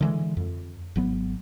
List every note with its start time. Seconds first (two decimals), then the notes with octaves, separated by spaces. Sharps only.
0.01 D3 E3 G#3
0.37 F2
0.96 G#1 F#3 B3